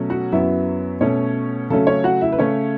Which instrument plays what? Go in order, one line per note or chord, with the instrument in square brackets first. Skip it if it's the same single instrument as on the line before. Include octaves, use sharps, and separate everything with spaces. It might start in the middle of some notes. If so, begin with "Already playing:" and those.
Already playing: [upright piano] B2 F#3 A3 C#4
F#4 F#5
F#2 F#3 B3 E4 E5
B2 A3 C#4 C#5
C#3 F#3 A3 C#4 A4
C#4 C#5
F#4 F#5
E4 E5
B4
C#3 A3 C#4 C#5